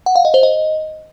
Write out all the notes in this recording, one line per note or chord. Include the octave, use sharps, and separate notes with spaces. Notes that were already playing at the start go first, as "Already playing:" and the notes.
F#5
F5
D#5
C5
D#5